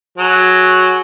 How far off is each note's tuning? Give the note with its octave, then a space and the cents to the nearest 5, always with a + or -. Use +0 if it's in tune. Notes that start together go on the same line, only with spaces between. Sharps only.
F#3 +0 G#4 +25